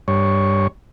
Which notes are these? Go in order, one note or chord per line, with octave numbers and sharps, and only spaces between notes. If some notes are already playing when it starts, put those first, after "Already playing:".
G2 C#5